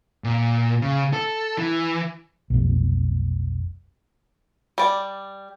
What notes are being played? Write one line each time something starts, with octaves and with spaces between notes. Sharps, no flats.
A#2
C#3
A4
E3
F1 B1
G3 D5